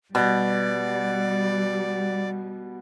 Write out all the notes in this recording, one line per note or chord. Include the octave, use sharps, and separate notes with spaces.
B2 G3 D5